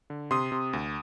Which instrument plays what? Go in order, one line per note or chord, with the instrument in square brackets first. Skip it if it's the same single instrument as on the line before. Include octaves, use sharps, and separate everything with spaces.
[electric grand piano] D3
C3 C6 D#6
C3
D2